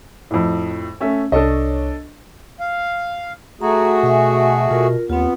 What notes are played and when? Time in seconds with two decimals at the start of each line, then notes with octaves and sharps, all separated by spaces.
0.31 F2 A2
1.00 A3 C#4 E5
1.32 C2 D4 A4 C#5 D#5
2.60 F5
3.61 A3 F#4 G#4 A#5
4.03 B2 E5 G#5
4.71 B2 F4 A#4
5.09 D#2 B3 C4 F4